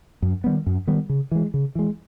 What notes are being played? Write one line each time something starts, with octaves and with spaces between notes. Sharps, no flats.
F#2
D#3 G3 B3
F#2
D#3 G3 B3
C#3
E3 G#3
C#3
E3 G#3